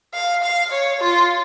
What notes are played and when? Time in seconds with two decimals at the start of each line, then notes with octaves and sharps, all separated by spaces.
0.14 F5
0.44 F5
0.72 C#5
1.01 F4